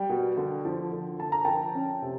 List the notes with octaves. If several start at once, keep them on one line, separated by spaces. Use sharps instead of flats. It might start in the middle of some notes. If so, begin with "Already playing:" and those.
Already playing: G3 G5
B2
D3
F3
D3
D3 A5
A#5
F3 G5 A5
C#4
C3